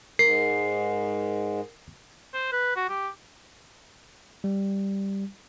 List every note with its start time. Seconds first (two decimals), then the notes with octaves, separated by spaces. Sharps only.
0.19 G#2 A#4 C7
2.34 C5
2.52 B4
2.76 F#4
2.89 G4
4.44 G3